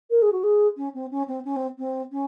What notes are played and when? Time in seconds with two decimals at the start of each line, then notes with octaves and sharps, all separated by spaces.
0.10 A#4
0.22 G#4
0.32 F#4
0.43 G#4
0.77 C#4
0.94 C4
1.11 C#4
1.28 C4
1.45 C#4
1.56 C4
1.78 C4
2.12 C#4